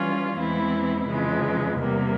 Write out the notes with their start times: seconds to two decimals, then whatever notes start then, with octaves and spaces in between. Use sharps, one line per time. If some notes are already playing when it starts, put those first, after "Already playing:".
Already playing: E3 G3 C#4 F4
0.37 E2 E3 G#3 C4 E4
1.08 F2 C#3 E3 G#3
1.79 E2 C3 G3 A#3